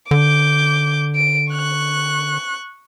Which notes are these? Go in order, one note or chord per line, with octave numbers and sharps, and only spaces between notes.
D3 D6 G6
D7
C#6 F#6